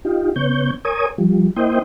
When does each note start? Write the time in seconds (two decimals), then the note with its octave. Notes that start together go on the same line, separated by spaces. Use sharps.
0.05 D#4 F4 G4
0.36 C#3 B3 C#5 G6
0.85 A#4 C#5 G#5 D#6
1.18 F3 G3
1.56 A#3 E4 C5 D#5 G5